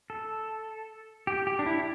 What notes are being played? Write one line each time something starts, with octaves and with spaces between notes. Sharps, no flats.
A4
G4
G4
D4
E4